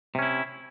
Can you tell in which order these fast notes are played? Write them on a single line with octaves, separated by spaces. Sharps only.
C3 C#4 E4